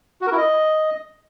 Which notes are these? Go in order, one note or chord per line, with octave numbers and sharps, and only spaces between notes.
F#4
A#4
E4
D#5